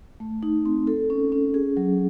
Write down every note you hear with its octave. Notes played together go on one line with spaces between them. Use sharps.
A3
D#4
C4
A4
C#4
C#4
G#4
F#3